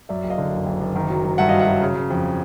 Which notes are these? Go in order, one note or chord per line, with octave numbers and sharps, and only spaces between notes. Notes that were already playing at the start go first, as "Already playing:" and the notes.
F#2 D5 E5
F#1
D#5 F5
D3
F#1
F#1
F#1
D#3
F#3
F#3
G2 E5 F#5
F#3 D#5 F5
E5 F#5
F#3
C#3
C#3
F2